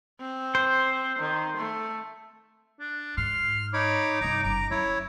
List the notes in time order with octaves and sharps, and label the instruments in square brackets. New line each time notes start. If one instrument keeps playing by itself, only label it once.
[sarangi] C4
[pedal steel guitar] C5
[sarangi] D#3
A3
[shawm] D4
[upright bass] G#2 [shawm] C6 [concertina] F6
[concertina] D#4 C#5 B5 [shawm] D6
[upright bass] G2 C3 [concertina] D#4 A#5
[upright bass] F#1 G3 [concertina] A#5
[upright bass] F#2 [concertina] E4 C#5